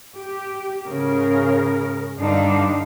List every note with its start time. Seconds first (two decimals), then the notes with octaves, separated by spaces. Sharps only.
0.18 G4
0.85 G#2 C#3 A#4
2.18 G2 D3 G3 D4 D#4 F5